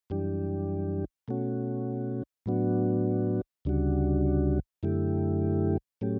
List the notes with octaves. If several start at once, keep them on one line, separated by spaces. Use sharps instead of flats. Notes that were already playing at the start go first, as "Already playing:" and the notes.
F#2 E3 G3 D4 G4
B2 A3 C#4 F#4
A2 F#3 B3 D4 F#4
D2 C#3 G3 D4 F#4
F#2 D3 A3 E4 G4
A2 F#3 A3 C#4 G4